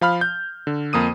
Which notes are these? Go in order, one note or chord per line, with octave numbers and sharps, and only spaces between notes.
F3 F5 B5 F6
G6
D3
F2 A#3 D#6 D#7